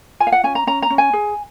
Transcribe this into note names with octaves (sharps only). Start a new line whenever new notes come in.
F4 G#5
F5
F#5
C#4 G#5
A#5
C#4 A#5
A#5
C#4
G#5
G#4